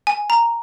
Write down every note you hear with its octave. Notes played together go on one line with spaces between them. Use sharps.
G#5
A#5